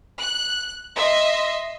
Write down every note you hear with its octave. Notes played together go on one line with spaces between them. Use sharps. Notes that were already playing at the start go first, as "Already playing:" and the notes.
F#6
D#5 E5 C6